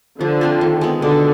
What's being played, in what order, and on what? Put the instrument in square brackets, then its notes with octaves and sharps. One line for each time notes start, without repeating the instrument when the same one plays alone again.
[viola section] D3 [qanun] F3
[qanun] A3 C4 F4
D#3
G#3 B3
[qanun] B2 [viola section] D3